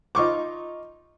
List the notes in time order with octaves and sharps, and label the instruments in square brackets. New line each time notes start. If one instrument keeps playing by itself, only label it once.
[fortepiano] D#4 F4 C#6 D6